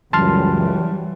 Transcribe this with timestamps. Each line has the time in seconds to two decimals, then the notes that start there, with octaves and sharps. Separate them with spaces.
0.13 C#2 F#2 E3 F#3 G3 A5 C6 F6